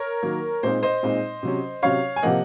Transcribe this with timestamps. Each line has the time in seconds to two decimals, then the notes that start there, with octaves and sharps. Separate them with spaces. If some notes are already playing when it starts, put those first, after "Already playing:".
Already playing: A#4 C#5
0.23 D#3 F#3 A#3
0.63 A#2 G#3 C4 D#4 C5
0.83 C5 D#5
1.03 A#2 G#3 C4 D#4
1.43 C3 F#3 C#4
1.83 C3 F#3 C#4 C#5 F5
2.16 G#5
2.23 C3 F3 A#3 D#5 F#5